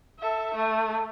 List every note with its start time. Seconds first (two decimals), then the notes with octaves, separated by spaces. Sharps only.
0.19 A4 E5
0.55 A3